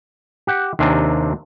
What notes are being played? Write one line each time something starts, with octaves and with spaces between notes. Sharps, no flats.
G4 F#5 G5
D#2 C3 C4 D4 A#4 G#5